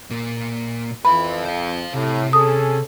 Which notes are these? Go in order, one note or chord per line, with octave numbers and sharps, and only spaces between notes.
A#2 A#3
F2 B4 E5 B5
C5 F5
A2 C3
C#4 G#4 A4 D#6